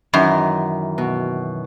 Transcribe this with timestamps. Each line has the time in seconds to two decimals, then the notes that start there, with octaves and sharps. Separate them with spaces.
0.14 F#2 D#3 E3
0.98 B2